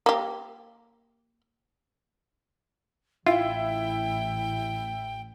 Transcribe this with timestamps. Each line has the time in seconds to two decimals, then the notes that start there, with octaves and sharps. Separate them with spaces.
0.06 A#3 G4
3.27 A1 E4 F4 G5